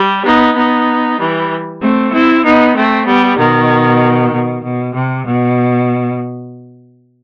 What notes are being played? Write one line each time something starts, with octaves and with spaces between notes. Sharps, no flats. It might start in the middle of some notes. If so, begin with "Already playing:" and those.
Already playing: G3
B3 D#4
B3 D#4
E3 G3
A3 C4
C4 E4
B3 D#4
A3 C4
G3 B3
B2 D#3
B2
B2
C3
B2